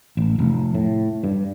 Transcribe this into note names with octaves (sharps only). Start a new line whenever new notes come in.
A1
F1
A2
G2